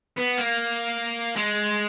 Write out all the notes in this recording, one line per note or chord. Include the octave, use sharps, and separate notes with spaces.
B3
A#3
G#3